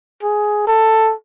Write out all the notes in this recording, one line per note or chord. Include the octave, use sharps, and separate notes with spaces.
G#4
A4